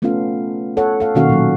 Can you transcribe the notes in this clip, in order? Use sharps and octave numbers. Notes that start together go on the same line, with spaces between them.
A3 B3 C#4 F4 A4 F5
A4 C#5 F#5
A4 F5
B2 D#3 A#3 C#4 F#4 F5
A#2 F#3